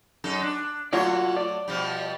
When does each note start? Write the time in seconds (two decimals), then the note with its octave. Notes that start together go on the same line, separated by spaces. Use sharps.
0.24 F#2 D#4 A4
0.42 D4
0.93 F#3 A3 F4 F#4 C#5 D5
1.37 D5
1.68 B2 F3 G3